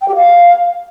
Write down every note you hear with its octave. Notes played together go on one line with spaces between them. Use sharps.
G5
G4
F5